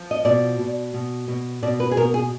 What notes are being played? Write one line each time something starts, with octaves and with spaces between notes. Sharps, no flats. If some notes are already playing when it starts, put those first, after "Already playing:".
Already playing: F3
D#5
B2 D5
B2
B2
B2
B2 D5
B4
G#4
B2 A#4
G#4